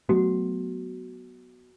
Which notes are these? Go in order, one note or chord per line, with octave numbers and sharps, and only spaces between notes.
F#3 A3 B3 F#4